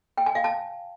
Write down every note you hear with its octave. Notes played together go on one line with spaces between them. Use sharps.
G5
G#5
F5
A5